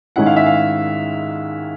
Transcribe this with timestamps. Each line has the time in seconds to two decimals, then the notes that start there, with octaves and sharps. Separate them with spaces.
0.16 G#2 D#3 G#3 C#4 E4 F#5
0.26 F5
0.36 E5
0.46 F5